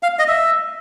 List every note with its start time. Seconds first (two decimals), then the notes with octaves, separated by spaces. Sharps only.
0.03 F5
0.19 D#5
0.28 E5